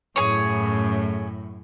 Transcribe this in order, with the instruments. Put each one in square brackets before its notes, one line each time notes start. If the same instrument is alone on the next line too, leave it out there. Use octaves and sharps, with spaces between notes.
[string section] F#2 A2 [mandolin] G#4 C#5